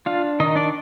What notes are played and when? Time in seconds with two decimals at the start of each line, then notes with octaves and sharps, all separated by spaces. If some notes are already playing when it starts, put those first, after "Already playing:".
0.06 D4 F4 F5
0.40 D#3 D#4 D#5
0.55 D4 D5